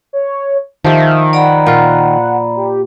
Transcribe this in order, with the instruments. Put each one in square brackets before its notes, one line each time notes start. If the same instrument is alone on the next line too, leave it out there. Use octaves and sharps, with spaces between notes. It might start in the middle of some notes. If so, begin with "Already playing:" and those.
[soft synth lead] C#5
[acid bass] D#3 [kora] F3 G4 [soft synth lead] E5
[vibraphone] D5 A#5 B5 [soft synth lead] F#5
[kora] A#2 F4
[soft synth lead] G4